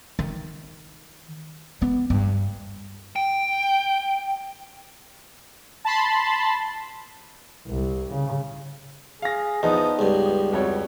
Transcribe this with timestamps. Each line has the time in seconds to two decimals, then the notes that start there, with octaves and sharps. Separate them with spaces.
0.19 D#3
1.82 B3
2.10 G2
3.16 G5
5.85 A5 B5 C6
7.68 C2
8.13 C#3
9.22 G#4 F5 A#6
9.63 E2 F3 B3 D#4 D#5
9.99 C#2 G2 G4
10.53 F2 G3 F#4 C#5